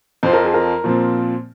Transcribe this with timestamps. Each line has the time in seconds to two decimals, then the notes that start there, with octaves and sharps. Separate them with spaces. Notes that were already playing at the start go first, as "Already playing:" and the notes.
0.23 F2 F3 C4 C5
0.33 A#4
0.45 G#4
0.54 A#4
0.84 A#2 F3 C4